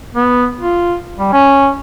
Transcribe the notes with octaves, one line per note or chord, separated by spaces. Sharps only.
B3
F4
G3
C#4